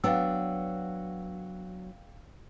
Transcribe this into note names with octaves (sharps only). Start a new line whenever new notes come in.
F#3 B3 D4 F5 G5 E6